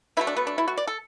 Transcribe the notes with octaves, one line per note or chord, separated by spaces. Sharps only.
B2 F#3 A3 E4
D4
B3
D4
E4
F#4
D5
A4